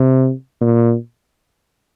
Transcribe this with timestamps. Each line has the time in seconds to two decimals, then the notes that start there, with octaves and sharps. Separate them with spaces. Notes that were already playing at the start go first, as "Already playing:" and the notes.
Already playing: C3
0.61 A#2